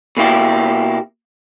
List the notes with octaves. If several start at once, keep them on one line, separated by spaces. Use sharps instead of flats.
B2 A#3 E4 G4